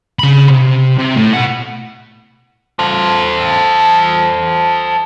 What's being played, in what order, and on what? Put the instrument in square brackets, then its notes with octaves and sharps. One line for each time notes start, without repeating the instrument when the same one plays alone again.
[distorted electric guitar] C#3 B5
C3
C3
A2
B2 F#5
[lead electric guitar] A4 C5